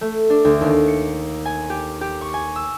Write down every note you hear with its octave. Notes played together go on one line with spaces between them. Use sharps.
A3
D4
D2
D#2
C#7
G#5
G4
G4
C#6
G#5
E6